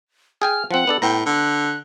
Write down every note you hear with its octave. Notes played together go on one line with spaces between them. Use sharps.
G#4 G5 G#5 F6
F3 C4 F#5
B3 D4 A4
A2 B3 G5 A#5
D3 F#6